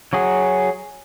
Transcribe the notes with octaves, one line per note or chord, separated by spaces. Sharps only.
F#3 F#4 G#4